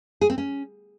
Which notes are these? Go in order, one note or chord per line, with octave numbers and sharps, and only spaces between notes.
G#4
C4
C#4